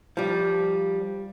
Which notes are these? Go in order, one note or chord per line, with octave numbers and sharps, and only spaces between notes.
F3 G3